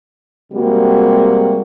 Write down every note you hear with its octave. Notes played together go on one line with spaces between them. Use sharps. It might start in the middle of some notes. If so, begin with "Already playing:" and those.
C3 G3 G#3 A#3 F#4